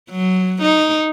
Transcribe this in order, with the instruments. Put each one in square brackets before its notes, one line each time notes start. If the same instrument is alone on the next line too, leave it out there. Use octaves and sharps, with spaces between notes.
[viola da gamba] F#3
D#4